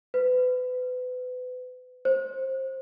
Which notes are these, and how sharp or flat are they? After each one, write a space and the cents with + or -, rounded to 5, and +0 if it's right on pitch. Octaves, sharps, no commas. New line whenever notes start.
B4 +30
C5 +20